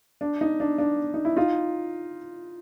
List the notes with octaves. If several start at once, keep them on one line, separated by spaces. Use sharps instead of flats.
D4
D#4
D4
D4
D#4
E4
D#4 F4